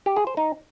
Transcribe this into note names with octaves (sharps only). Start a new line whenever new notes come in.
G4
G#4
C5
D#4